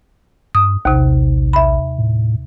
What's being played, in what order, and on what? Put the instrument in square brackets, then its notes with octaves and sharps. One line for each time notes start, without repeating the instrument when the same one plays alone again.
[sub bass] G2 [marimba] D#6
[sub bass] A#1 [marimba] D#2 C3
[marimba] E5 B5
[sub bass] A2